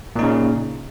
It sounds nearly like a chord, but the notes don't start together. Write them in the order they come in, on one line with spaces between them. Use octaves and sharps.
A#2 D#4 C#3